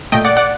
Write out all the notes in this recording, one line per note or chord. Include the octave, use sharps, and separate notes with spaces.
A#2 A3 D#5 G5
D5 F#5
D5 F#5